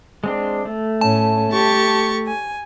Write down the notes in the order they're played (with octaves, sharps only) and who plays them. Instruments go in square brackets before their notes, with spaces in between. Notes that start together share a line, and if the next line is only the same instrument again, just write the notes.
[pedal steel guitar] G#3 C4 D4
A3
[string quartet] A2 C#4 [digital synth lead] A5
[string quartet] G4 C#6 A6
G#5